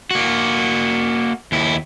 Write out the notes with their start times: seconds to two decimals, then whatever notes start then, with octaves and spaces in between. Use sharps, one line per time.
0.11 A#3 F#4
1.52 D#2 E4